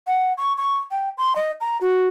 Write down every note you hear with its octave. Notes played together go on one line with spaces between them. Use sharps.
F#5
C#6
C#6
G5
C6
D#5
A#5
F#4